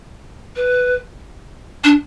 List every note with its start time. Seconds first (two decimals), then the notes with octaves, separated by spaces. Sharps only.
0.56 B4
1.84 D4